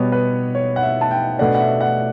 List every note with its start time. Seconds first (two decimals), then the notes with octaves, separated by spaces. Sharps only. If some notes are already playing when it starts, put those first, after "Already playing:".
Already playing: B2 G3 B3 C#5
0.12 B4
0.55 C#5
0.76 F#5
0.83 E5
1.01 A5
1.11 G5
1.39 B2 A3 D4 F#5
1.54 F#5
1.60 E5
1.81 F#5